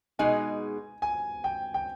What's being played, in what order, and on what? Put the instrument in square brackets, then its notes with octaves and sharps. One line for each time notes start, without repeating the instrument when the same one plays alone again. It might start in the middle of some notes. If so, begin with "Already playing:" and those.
[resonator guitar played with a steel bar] B2 G#3 D#4 G#4 [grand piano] G#5
[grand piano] G#5
G5
G5